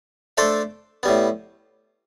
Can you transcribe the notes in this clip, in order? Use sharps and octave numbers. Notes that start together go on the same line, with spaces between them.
A3 D4 A4 C5 E5
A2 G3 B3